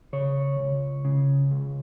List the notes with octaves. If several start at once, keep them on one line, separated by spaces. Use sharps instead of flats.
C#3 C#5
C#2
C#3
C#2